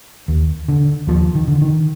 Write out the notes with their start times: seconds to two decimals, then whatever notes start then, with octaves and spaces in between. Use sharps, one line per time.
0.28 D#2
0.68 D3
1.07 D#2 F3
1.35 D#3
1.48 D3
1.61 D#3